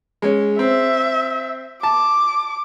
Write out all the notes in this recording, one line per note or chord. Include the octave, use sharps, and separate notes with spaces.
G#3 C#4
C4 E5
A5 D6